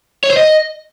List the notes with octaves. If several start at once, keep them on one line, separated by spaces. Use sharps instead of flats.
C#5
C5
D#5